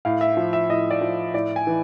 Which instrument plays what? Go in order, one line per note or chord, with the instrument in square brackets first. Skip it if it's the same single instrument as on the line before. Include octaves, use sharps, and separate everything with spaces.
[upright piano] A2 F5
E5
F3
E5
A2 D#5
D5
F3
A2 D5
G#5
E3